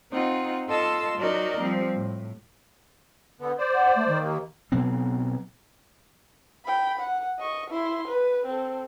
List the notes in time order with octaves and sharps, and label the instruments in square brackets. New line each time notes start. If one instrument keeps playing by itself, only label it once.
[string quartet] C4 D#4 F4 F#5
F4 A4 D#5 A5 C6 E6
F#3 D#4 F#4 A#4 D5 D#5
F3 G3 C4
A2
[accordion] D3 B3
C5 D5
[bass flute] F#5
A3
D#3
[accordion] D#2 A#3
[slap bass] B2 F#3 B3 C4
[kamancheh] G5 B5
F#5
D#5 C#6
E4 C6
B4
C4 A4